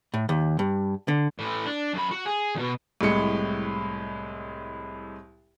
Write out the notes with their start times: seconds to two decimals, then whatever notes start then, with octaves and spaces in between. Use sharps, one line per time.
0.14 A2
0.29 D#2
0.59 G2
1.08 D3
1.39 A2 E3
1.65 D4
1.93 F#2 B5
2.11 F#4
2.25 G#4
2.55 E2 B2
3.01 C2 A2 G#3 C#7